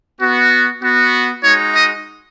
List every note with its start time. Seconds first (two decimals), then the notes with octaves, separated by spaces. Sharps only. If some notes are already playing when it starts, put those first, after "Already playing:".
0.21 B3 F#4
0.82 B3 F#4
1.43 G#3 D#4 F#4 C#5
1.74 D#5